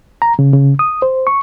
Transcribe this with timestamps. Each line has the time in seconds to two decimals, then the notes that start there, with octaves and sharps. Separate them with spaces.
0.22 A#5
0.39 C#3
0.53 C#3
0.79 D#6
1.02 C5
1.27 C#6